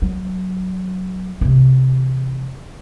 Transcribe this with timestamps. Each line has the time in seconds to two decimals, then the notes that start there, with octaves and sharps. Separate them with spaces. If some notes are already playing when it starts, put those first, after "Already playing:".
0.02 F#3
1.41 C3 E3